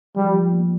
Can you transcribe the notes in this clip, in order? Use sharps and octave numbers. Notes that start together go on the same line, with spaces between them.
F3 G3
F3
A#3